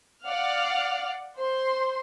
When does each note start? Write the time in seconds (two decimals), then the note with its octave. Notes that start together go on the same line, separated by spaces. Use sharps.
0.24 D5 F5 F#5 F6
1.37 C5 C6